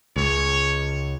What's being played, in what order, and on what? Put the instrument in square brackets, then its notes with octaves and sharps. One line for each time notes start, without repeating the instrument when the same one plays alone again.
[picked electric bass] C#2 [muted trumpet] C#5